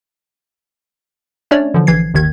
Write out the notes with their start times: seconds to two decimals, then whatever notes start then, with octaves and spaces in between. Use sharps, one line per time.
1.51 A3 C#4 D4 C#5 D5
1.74 D3 E3 F3
1.87 A#1 E3 G#6 C7
2.14 G1 D#2 D#3 G#6